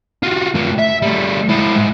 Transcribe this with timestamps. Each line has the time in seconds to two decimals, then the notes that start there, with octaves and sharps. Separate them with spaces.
0.23 F4 F#4
0.56 A3 F4
0.79 E5
1.02 G3 A3
1.48 G#3 E4
1.75 G#2